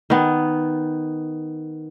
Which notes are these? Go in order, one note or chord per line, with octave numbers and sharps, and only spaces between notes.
D#3 B3